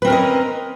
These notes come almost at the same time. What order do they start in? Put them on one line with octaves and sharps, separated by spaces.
B4 C4 A#4 C#4 D#5